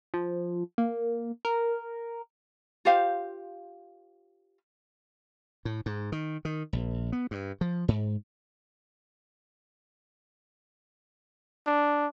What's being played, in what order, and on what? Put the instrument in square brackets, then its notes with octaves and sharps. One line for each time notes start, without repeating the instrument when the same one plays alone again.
[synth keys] F3
A#3
A#4
[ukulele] F4 G4 C5 F5
[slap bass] A2
G#2
D#3
D#3
A#1
B3
G2
F3
G#2
[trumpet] D4